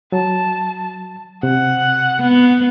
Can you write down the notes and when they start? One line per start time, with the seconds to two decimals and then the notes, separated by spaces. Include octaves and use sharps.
0.12 F#3 A5
1.43 C3 F#5
2.21 B3